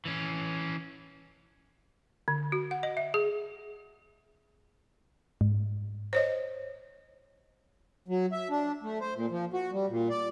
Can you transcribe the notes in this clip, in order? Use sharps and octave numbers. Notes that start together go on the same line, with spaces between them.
E3 C#4
D3
F#4
F#5
D#5
E5
G#4
G#2
C5 C#5 D#5
F#3
E5
D4
A3
C5
A#2
F3
F#4
G3
A#2
D5